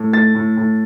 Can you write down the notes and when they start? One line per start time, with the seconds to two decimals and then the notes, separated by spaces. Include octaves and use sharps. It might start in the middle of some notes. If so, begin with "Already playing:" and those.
Already playing: A2
0.13 A3 A6
0.35 A2
0.57 A2